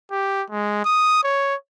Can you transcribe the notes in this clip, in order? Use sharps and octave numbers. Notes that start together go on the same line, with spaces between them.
G4
G#3
D#6
C#5